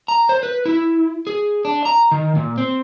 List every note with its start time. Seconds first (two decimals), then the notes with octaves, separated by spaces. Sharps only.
0.08 A#5
0.29 C5
0.43 B4
0.66 E4
1.27 G#4
1.65 D4
1.85 A#5
2.11 D#3
2.36 A#2
2.58 C4